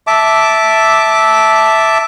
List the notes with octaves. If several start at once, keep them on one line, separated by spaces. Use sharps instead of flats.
E5 A5 D6